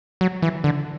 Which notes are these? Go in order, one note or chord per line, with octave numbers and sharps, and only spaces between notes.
F#3
E3
D3